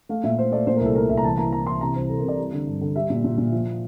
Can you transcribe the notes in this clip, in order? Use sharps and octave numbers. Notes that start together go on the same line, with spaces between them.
A3 F5
A#2 E5
A3 C5
A3 D5
A#2 C5
A#4
C2
A4
A3 A#4
C2 E5
A#5
E3 A5
A#3 A#5
E3 A#5
E3 C6
C3 A#5
C2 C5
C2 A4
A#4
C3 D5
G3
D3
G2
D3
G3 E5
A#2
A#2
A#2
F3